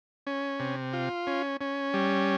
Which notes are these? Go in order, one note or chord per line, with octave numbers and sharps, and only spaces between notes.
C#4
C3
F4
C#4
C#4
G3